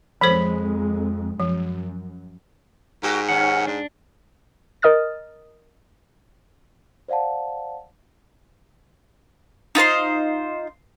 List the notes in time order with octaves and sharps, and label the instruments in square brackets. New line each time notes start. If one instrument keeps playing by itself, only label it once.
[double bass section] F2 G#3 [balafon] F3 A4 C5 [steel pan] B5
[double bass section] F#2 [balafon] F3
[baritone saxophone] G#2 [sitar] F#4 G4 A#4
[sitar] D#2 C#4 [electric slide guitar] F#5
[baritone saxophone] G#2 [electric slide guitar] D4
[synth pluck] A#4 D#5 D#6 F6 A6
[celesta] C5 D5 F5 F#5 A5
[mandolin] D#4 F4 C5 C6